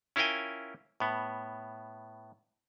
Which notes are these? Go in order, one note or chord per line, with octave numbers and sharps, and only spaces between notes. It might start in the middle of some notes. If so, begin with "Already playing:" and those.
C#4 E4 F4 A#4 G5 G#5
A2 B3